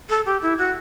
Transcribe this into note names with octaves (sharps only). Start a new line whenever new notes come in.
A4
G4
E4
F#4